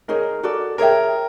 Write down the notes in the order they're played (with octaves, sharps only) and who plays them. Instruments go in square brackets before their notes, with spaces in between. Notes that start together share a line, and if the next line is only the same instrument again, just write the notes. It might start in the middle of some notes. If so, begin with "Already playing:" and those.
[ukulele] D#4 G#4 C#5 [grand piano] A#4
[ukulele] F#4 A4 D5
[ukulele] G#4 C#5 E5 G5 [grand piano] A#4